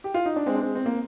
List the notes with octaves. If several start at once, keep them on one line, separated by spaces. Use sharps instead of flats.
G4
F4
D#4
D4
G#3 C4
D4
G#3 C4
C4
A#3